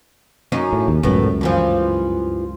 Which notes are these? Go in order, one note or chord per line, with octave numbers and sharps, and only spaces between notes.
F#2 C#4 D#4
A2
D#2
C#2 F#2 A2 B3
G2 E3 F3